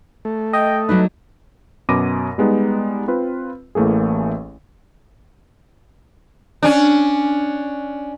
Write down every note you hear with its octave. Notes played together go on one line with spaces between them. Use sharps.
A3
D#5 G5
F#3 D4 D#4 B4
F#2 B2 B5 D6 A#6 D#7
G3 G#3 B3 D#4
C4 F4 B4
A1 E3 A3 A#3 G#4
C#4 D4